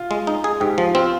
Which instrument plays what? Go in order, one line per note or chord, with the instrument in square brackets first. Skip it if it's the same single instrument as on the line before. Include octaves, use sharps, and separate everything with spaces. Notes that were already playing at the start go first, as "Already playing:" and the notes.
Already playing: [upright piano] F4
[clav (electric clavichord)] G#3
D#4
G#4
[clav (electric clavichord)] G#2 [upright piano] G4
[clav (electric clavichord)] F3
[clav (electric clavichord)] C4 [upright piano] F4